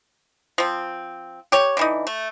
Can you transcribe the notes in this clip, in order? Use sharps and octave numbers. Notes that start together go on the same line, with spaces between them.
F3 C4
G4 C#5
D3 E3 D#4
A3